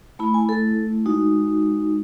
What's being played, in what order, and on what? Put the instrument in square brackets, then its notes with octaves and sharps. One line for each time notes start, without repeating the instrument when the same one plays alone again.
[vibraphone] A3 E4 B5
G#5
A4
G#3 D#4 F#4